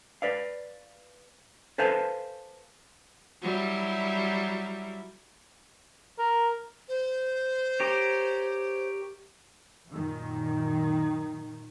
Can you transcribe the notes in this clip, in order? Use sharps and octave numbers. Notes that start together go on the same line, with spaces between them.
B4 D5 F5
A4 B4 C5 F5 G#5 A5
F#3 G3 E4
A#4
C5
G4 A#4 C#5
F#2 A#2 D#3